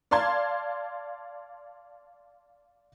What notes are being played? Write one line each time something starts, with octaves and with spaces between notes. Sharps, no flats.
D5 F5 A5 C6 G#6